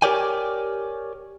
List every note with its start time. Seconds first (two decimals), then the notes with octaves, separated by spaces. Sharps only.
0.02 G4 A#4 C#5 D5 G5 G#5